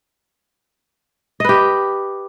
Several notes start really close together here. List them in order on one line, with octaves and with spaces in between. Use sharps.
D#5 B4 G4